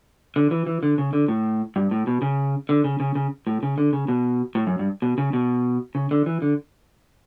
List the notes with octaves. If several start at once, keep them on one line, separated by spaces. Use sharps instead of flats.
D3
E3
E3
D3
C#3
D3
A2
G2
A2
B2
C#3
D3
C#3
C#3
C#3
A2
C#3
D3
C#3
B2
A2
F#2
G2
B2
C#3
B2
C#3
D3
E3
D3